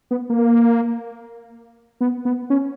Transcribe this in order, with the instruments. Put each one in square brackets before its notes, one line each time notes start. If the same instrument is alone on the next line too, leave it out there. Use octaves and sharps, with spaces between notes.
[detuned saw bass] B3
A#3
B3
B3
C#4